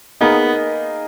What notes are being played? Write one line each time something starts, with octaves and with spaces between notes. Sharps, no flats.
A#3 B3 D#4 G#4